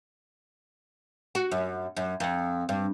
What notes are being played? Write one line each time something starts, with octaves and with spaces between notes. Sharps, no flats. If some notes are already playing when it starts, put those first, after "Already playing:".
F#4
F#2
F#2
F2
G2